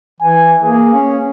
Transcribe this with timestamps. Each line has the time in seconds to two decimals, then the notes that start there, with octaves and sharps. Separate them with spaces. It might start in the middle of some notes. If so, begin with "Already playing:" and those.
0.21 E3 G#5
0.63 A#3 G#4
0.94 C#4